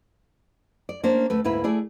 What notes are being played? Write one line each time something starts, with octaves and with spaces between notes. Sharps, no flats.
D5
A#3 C#4 D4 C5
D2 A3 B4
D2 G#2 A#3 E4 B4 E5
A3 E4 G#4 D5